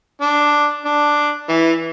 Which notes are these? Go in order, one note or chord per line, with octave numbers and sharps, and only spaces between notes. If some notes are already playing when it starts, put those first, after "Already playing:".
D4
D4
E3